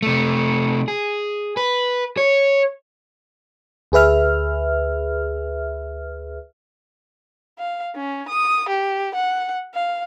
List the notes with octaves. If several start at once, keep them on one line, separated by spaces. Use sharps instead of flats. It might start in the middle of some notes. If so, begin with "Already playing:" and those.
C3 A3
G#4
B4
C#5
D2 G#4 B4 E5 F6
F5
C#4
D#6
G4
F#5
F5